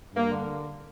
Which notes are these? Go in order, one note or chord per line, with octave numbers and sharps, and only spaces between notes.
G2
A#3
D3